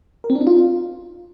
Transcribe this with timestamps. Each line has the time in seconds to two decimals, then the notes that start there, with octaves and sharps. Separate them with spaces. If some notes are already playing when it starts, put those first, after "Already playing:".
0.24 A#4
0.30 C4
0.35 D4
0.41 D#4
0.47 F4